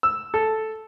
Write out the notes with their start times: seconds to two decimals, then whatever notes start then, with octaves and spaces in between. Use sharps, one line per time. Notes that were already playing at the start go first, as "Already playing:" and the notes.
0.03 E6
0.34 A4